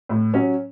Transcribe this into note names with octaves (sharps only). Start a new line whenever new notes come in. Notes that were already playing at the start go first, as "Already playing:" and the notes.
A2
F#3 C#4